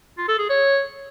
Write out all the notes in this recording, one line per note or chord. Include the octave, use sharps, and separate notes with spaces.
F4
A4
G#4
C#5